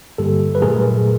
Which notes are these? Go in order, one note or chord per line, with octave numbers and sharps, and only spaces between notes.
G2 D3 G3 A#3 G4 A4
B4
A#2 F#3 A3 G#4 A#4